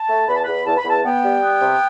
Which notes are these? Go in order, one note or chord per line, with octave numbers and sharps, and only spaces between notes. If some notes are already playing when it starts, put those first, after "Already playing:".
Already playing: A5
A3
E2 B5
A5
E2 B5
E2 A5
B5
E2 A5
B3 G5
G3
B3
C3